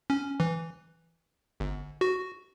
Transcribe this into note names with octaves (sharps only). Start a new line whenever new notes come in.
C#4
E3
G1
F#4